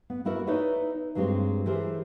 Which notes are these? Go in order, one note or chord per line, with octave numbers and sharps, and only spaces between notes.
B3
A#3 B3 E4 F#4 A#4
D#4 E4 B4 C#5 D5 E5
G2 F#3 G#3 A#3 C4 G4
E3 G4 G#4 A#4 C5